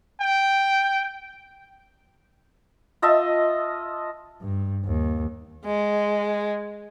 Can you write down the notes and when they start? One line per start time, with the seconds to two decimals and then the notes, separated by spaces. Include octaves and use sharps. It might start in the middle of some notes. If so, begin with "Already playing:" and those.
0.21 G5
3.02 F4 D#5 E5 A5
4.42 G2
4.84 D#2
5.65 G#3